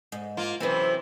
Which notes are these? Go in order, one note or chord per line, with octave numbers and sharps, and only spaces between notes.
G#2
A#3 F4
F#2 C3 E3 C4 B4